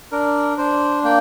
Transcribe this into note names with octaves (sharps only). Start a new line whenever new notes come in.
D4 A#4
D4 C5
A#3 G5